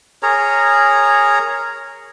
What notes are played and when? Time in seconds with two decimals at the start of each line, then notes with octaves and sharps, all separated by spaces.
0.23 G#4 A#4 C#5 A#5